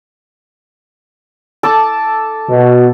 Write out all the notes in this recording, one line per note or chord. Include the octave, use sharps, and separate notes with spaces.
A4 A5 D6
B2